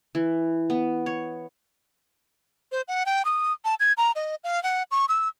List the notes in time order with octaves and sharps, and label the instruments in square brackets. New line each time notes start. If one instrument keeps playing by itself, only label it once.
[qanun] E3
B3
C#5
[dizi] C5
F#5
G5
D#6
A5
G#6
A#5
D#5
F5
F#5
C#6
E6